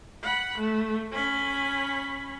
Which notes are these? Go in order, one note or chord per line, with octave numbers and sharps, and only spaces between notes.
F#5 B5
A3
C#4 B5